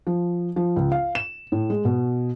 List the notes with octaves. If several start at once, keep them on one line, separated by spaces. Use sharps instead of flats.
F3
F3
C#2
F5
E7
A2
G#3
B2